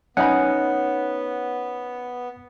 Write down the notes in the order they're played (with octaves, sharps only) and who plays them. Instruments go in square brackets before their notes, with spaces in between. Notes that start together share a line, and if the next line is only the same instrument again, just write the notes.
[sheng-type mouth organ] B3 [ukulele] C#4 D#4 B5 [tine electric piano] F#5